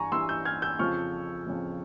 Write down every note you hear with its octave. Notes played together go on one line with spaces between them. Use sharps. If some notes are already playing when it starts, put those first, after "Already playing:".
Already playing: G2 E3 G#5 A#5 C#6
G2 E3 C6 E6
E6 G6
F6 G#6
E6 G6
F2 C#3 F3 C#6 F6
F2 C#3 F3